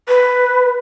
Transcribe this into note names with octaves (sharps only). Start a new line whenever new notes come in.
B4